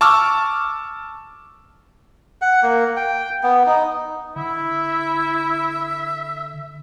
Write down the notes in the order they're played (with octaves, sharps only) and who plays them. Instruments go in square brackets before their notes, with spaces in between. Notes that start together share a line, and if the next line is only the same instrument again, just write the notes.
[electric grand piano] A5 C#6 D6 E6 F6
[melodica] F#5
A#3
G5
B3
D#4
[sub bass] D3 [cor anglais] E4 [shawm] E5